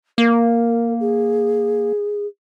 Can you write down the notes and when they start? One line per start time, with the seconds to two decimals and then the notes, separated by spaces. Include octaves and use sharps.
0.18 A#3 A#4
1.00 G#4